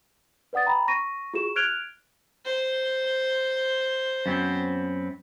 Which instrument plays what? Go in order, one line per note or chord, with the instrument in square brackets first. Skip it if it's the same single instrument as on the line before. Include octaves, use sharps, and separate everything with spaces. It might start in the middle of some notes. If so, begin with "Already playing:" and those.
[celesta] B4 D5 F#5 D#6 A6
G5 A#5 B5
C#6 A#6 D#7
F4 F#4 G#4 C#6 E7
F6 F#6 G#6 D7 F7 G7
[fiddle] C5
[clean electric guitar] F#2 B3 C4